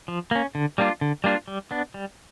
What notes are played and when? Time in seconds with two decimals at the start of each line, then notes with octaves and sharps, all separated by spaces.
0.08 F3
0.31 A#3 C#4
0.55 D3
0.78 G3 A#3 D4 F4
1.01 D3
1.24 G3 A#3 D4 F4
1.48 G3
1.71 B3 D4
1.94 G3